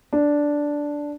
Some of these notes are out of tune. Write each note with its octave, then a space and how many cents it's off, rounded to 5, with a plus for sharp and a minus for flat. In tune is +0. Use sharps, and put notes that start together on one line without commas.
D4 -5